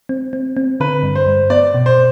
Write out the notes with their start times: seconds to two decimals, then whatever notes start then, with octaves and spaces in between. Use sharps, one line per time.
0.09 C4
0.33 C4
0.57 C4
0.80 D3 B4
1.03 G2
1.15 C5
1.27 G2
1.50 B3 D5
1.74 B2
1.86 C5